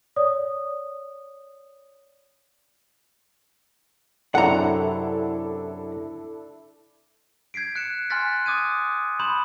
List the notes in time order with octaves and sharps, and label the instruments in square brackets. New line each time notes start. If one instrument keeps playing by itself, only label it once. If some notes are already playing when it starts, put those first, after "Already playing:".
[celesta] C#5 D5 D#6
[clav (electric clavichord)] F#2 C3 [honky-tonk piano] D4 E4 A4 [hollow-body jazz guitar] F#5 A#5
[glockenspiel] G6 G#6 B6 C7 D7
F#6 C#7 E7
G#5 C6 F6 F#6 A6 B6
D6 D#6 F#6 G#6 D#7
B5 C6 D#6 G6 E7 F#7